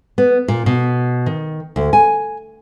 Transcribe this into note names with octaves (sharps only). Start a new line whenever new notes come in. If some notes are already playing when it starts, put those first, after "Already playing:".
B3
A#2
B2
D#3
D2
G#5